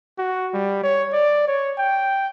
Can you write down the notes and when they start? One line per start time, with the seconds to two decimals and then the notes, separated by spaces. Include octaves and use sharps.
0.19 F#4
0.54 G3
0.83 C#5
1.13 D5
1.48 C#5
1.78 G5